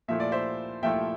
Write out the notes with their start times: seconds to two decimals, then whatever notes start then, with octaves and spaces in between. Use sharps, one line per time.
0.08 A#2 F3 A3 E4 E5
0.20 D5
0.32 C5 E5
0.82 A#2 F3 A3 E4 E5 G5